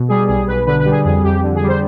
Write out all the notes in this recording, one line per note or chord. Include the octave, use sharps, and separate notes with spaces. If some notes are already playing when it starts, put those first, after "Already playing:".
Already playing: B2
G3 G#4
B1 G#4
B1 B4
D3 B4
B4
G3
G#4
F2 G#4
F2 G4
D3
G#4
G3
C5